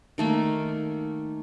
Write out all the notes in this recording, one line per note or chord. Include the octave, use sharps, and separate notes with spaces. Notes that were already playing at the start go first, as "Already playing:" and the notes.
D#3 A3 A#3